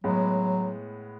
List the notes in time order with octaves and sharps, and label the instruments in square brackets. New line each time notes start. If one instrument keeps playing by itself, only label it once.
[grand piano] A2 G#3 B3 [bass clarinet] F#3